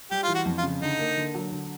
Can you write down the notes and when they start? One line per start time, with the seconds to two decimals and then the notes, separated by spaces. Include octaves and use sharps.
0.11 G3 G4
0.23 E3 F4
0.35 F#4
0.46 F2
0.58 F4
0.63 C#3
0.81 D3 D#4
0.99 A#3
1.17 D3
1.35 F#3
1.52 D3